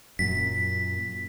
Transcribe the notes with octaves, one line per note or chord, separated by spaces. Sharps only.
F#2 A#2 B6